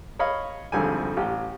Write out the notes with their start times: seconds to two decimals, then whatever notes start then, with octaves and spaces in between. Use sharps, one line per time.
0.19 C#5 D#5 F5 B5
0.72 G#1 F2 D3 G3 G#5
1.17 A1 G4